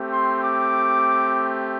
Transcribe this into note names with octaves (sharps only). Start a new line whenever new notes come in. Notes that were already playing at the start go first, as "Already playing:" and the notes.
Already playing: A3 C4 G4
C6
D6